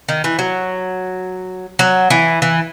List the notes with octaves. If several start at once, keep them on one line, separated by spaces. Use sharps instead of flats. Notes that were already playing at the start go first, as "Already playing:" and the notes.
D#3
E3
F#3
F#3
E3
E3